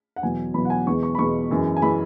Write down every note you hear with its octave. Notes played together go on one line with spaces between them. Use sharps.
F#5
E2 B2 F#3 G#5
E2 B2 F#3 B5
F#5
G#5
E2 B2 G#3 C#6
C#6
B5
E2 B2 G#3 C#6
F#2 E3 G#3
G#5
E3 G#3 B5